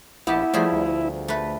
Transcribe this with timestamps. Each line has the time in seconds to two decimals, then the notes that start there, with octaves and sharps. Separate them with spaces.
0.27 A#1 B3 E4 G4 A5
0.54 F3 G3 A3 G#4
0.72 D2
1.28 A3 B4